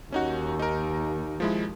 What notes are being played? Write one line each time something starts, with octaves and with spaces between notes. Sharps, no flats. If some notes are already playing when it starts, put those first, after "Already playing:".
D#2 C#4 D#4 F#4
D#4 A#4
F3 G#3 E4